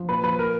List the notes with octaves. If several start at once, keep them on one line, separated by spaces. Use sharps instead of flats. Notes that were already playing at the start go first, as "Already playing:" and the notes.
Already playing: F3
A#2 B4
F3 B4
A#2 A#4